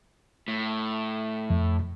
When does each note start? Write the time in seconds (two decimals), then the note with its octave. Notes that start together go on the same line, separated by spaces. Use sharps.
0.48 A2
1.50 F2